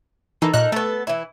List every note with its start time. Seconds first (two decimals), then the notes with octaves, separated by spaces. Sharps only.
0.42 E3 A#3 D#4 A4
0.54 A#2 D#4 A4 A#4 F#6
0.72 A3 B3 A4
1.07 E3 E4